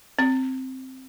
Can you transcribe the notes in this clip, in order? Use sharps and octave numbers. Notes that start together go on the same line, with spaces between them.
C4